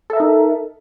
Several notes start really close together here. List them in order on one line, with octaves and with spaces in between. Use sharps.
A4 E5 A#4 D#4